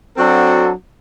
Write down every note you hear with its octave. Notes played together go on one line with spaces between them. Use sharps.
F#3 C4 D4 F#4 A4